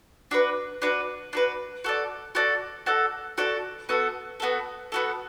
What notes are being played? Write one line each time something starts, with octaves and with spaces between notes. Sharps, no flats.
D4 F#4 B4
D4 F#4 B4
D4 F#4 B4
F#4 A4 D5
F#4 A4 D5
F#4 A4 D5
F#4 A4 D5
B3 F#4 A4
B3 F#4 A4
B3 F#4 A4